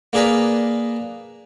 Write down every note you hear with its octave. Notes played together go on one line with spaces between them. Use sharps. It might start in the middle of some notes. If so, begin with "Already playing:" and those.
A#3 D4 G#4 A#4 B4